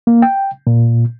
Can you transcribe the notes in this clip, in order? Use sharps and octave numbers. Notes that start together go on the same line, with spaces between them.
A#3
G5
A#2